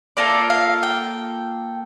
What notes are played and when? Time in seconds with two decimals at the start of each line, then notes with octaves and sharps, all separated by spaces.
0.17 A#3 F4 A4 D5
0.50 F5
0.83 G5